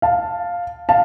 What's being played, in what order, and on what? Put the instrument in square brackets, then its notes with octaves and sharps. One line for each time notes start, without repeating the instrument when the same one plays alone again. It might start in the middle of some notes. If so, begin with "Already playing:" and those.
[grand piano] F5 A5
F5 A5